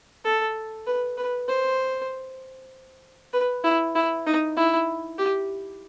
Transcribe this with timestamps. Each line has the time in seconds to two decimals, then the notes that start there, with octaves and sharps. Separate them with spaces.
0.25 A4
0.87 B4
1.17 B4
1.48 C5
3.33 B4
3.64 E4
3.95 E4
4.26 D#4
4.57 E4
5.19 G4